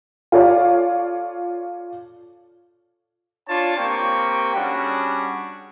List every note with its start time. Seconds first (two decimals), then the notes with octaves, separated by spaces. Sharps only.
0.32 F4 A4 C#5 D5 F5
3.48 D4 F4 C#5 A5
3.77 A#3 C4 G4 G5 C#6
4.55 G3 C#4 D4 F#4 G#4